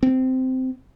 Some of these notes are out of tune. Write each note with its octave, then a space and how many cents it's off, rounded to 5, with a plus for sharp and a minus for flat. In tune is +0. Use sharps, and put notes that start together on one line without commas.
C4 -15